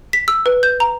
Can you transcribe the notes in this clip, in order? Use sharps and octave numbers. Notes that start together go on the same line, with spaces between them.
B6
E6
B4
G6
A#5